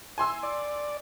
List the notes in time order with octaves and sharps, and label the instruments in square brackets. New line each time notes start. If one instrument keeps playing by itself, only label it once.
[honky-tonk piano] G#5 C6 E6
[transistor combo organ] D5